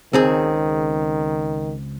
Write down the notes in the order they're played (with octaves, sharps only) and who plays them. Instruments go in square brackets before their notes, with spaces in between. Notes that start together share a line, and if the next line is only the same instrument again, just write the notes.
[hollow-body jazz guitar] C#2 C4 G#4 [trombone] D#3